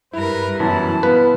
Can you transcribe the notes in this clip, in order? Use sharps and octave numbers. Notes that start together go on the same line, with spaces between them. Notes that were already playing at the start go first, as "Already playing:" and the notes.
G2 E4 A#4 B4
F#2 B2 E3 E4 A5
B3 F4 B4